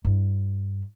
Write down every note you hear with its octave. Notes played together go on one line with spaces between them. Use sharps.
G2 E4